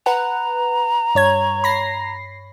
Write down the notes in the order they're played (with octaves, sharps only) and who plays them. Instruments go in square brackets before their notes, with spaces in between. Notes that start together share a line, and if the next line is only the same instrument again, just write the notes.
[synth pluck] B4 F#5 [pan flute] A#5
[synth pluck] G2 C#5 G#6
B5 A#6 C7